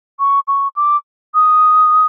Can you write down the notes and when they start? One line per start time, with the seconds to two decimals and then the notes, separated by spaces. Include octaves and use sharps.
0.19 C#6
0.48 C#6
0.76 D6
1.34 D#6